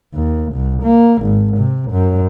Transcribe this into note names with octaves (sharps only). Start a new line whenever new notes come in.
D#2
C2
A#3
G#1
C3
F#2